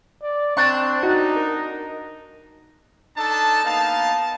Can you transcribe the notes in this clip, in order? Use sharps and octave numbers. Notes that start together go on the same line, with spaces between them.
D5
C4 D4 C#6
D#4 F#4
A#4
D4 D#4 A4 A5
A#3 B3 D#4 F5 A5